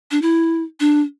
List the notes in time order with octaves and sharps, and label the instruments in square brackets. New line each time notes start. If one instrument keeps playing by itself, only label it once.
[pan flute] D4
E4
D4